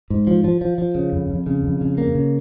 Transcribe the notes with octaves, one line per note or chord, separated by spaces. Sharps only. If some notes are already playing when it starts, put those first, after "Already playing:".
G#2
F3
F3
F3
F3
C#3
F2
F2
C#3
F2
C#3
A#3
C#3